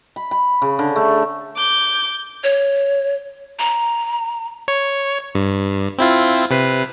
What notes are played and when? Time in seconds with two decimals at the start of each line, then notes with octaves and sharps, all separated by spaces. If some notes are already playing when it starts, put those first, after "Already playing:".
0.16 B5
0.31 B5
0.62 C#3
0.79 D3
0.96 A3
1.56 D6 G6
2.43 C#5
3.59 A#5
4.68 C#5
5.35 G2
5.98 C4 E4 F4
6.51 C3 B4 C7